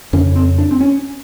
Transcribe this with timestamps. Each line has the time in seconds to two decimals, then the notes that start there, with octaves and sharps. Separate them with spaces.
0.13 F2 C#3 C#4
0.36 C4
0.58 D4
0.71 C4
0.81 C#4